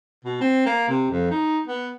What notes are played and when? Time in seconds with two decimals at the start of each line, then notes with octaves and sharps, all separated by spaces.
0.25 B2
0.41 C4
0.66 A#3
0.89 C3
1.10 F2
1.31 D#4
1.68 B3